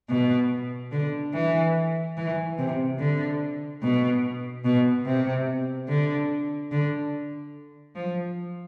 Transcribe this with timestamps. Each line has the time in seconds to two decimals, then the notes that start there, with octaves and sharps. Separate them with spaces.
0.09 B2
0.92 D3
1.34 E3
2.17 E3
2.58 C3
2.99 D3
3.83 B2
4.65 B2
5.06 C3
5.89 D3
6.72 D3
7.96 F3